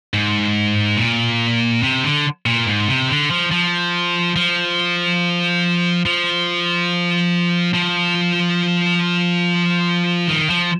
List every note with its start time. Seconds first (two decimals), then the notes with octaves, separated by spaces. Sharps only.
0.14 G#2
0.97 A#2
1.83 C3
2.03 D3
2.46 A#2
2.67 G#2
2.88 C3
3.09 D3
3.30 F3
3.51 F3
4.36 F3
6.05 F3
7.74 F3
10.28 D#3
10.50 F3